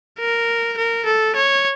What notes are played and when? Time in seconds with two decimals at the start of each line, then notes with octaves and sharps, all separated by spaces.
0.20 A#4
0.78 A#4
1.06 A4
1.36 C#5